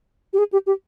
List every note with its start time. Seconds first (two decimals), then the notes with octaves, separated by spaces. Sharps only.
0.33 G4
0.38 G#4
0.53 G4
0.67 G4